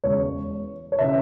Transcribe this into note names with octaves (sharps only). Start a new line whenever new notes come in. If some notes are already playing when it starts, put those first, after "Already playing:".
E1 E2 C#3 G#3 C#5
C#5
C#3 E3 C#4 E5